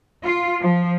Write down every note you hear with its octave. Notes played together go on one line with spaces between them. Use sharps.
F4
F3